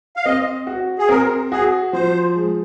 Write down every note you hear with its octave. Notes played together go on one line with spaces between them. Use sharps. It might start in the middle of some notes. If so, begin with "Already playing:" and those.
F5
C4 D#5
F#4
G#4
C4 A#4
F#4 G#4
F3 C5
G#3